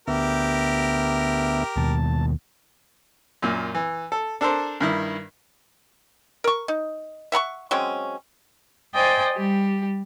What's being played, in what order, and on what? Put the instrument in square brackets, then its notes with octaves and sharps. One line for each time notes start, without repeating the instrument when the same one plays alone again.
[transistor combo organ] D2 B3 E5 [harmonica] G4 A#4
[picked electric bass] D#2 B2 [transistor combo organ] A5
[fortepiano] F#2 A#2
E3
A4
D4 A4 A#4 C5
G2 D#3 E4
[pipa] A#4 C#6
D#4
E5 F#5 A#5 C#6
F#3 G#3 C4 C#4
[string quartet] C5 D5 D#5 G5 G#5
G3 G4